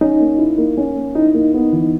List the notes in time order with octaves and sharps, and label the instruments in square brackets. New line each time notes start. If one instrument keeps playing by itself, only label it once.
[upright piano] C#4 [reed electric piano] D#4
[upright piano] A#3
E4
A#3
C#4
A#3
[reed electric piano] D#4 [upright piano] E4
[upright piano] A#3
B3
E3